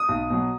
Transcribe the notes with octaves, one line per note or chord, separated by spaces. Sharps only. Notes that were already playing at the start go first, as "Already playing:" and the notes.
Already playing: D#6
B1
B2 F#3